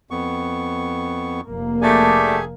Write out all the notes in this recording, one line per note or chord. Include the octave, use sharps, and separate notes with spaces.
F2 B3 C#6
F1 A#3
A3 D4 G4 G#4 G#5